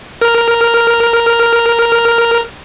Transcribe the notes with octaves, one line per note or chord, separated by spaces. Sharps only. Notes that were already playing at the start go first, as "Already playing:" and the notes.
A#4 F6